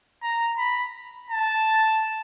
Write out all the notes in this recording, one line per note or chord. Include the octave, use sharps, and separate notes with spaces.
A#5
B5
A5